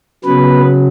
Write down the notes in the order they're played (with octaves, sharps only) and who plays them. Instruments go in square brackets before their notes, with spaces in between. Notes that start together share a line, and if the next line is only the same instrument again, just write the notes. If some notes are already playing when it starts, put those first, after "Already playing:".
[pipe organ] C#3 F#3 B3 B4